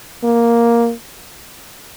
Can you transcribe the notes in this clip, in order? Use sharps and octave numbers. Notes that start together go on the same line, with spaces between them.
A#3